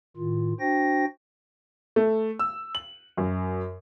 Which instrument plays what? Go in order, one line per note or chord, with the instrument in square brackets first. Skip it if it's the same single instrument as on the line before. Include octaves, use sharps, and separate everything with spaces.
[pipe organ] A2 D#3 F4
D4 F#4 C5 G5 A#6
[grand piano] A3
E6
F#7
F#2